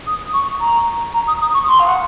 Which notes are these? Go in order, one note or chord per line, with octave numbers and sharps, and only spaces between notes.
D#6
C#6
A#5
A#5
D#6
D#6
C#6
C6
F5
F#5